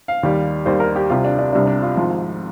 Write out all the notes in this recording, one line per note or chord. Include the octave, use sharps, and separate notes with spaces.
F5
D#2 D#3 G3
D#2 D#3 G3 C5
A#4
G4
C2 C3 G3 F4
D4
D4
C2 C3 G3 D4
D4
F4
G#1 G#2 F3